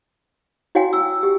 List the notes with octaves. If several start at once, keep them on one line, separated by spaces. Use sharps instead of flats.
E4 F#4 C#5 F5 G5 G#5
E6
G4